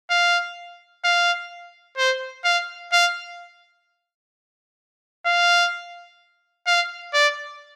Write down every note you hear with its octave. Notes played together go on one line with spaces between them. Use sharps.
F5
F5
C5
F5
F5
F5
F5
D5